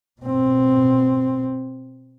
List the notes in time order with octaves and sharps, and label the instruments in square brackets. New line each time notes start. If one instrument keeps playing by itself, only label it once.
[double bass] B2 C4